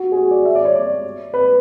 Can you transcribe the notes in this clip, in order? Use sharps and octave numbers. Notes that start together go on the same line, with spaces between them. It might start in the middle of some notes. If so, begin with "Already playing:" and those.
Already playing: F#4
G#4
F#4
D5
E5
D5
C#5
D5
B4